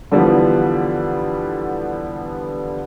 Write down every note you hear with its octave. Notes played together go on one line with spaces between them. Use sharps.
D3 E3 F3 G3 B3